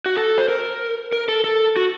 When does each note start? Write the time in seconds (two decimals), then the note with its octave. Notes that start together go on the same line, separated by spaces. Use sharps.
0.06 F#4
0.17 A4
0.38 C5
0.48 A#4
1.12 A#4
1.28 A4
1.44 A4
1.76 F#4